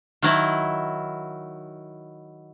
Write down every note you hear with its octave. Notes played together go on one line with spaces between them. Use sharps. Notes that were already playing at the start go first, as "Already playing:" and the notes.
D#3 F#3 E4